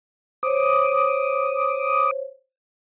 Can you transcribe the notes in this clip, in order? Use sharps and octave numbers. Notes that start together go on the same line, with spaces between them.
C5 C#5 D6 D#6